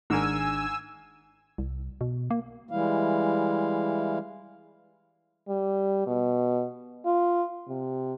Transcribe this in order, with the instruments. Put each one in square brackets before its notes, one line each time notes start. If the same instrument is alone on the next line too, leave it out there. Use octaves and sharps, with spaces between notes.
[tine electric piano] G#1 D4 [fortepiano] G#2 A#4 [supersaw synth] G#5 E6
[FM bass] C2
B2
A#3
[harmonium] E3 G3 G#3 E4 F5
[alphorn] G3
B2
F4
C3